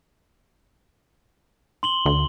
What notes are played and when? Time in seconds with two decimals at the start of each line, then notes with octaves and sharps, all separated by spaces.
1.83 C6 F#7 G7
2.06 D2